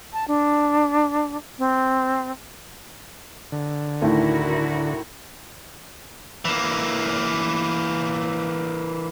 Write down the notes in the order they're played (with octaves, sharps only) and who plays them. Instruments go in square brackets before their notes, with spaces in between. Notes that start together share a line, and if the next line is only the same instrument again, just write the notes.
[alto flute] A5
D4
C4
[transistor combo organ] D3
[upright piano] D2 A2 D#3 [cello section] E4 F#4 A#4
[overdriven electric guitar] E3 A#3